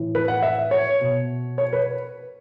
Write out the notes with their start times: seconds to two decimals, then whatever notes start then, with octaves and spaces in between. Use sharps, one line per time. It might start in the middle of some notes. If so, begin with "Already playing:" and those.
Already playing: A2 E3
0.15 B4
0.28 F#5
0.42 E5
0.71 C#5
1.01 B2
1.58 C#5
1.73 B4